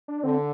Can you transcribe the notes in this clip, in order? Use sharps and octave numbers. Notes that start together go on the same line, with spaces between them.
D4
D3 C4